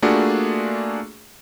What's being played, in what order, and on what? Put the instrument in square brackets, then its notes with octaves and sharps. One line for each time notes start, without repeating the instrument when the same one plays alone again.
[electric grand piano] A3 A#3 D4 F4 F#4 G#4